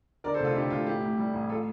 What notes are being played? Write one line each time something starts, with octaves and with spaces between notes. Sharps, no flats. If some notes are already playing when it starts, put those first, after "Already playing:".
D3 A#4 D5
A4 C5
F1
F4 A4
D3 E4 G4
F1 F4
A1 E4 G4
A2
G3
A1
F4 A4